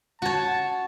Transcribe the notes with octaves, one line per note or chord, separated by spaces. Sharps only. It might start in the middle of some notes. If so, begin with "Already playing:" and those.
F#4 C#5 A5